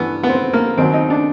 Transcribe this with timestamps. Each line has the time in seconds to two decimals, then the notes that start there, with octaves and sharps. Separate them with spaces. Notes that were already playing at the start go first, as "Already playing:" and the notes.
Already playing: G2 E3 B3
0.23 B3
0.29 C4
0.53 A#3
0.77 D#2 D#3 F#3 C4
0.94 D#4
1.10 D4